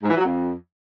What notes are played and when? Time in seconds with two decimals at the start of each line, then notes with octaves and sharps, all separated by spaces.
0.03 G#2
0.10 E3
0.17 F#3
0.24 F2